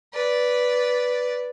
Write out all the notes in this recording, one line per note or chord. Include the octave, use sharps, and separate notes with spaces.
B4 D5